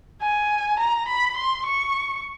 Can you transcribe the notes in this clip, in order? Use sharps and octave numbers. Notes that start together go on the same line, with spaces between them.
G#5
A#5
B5
C6
C#6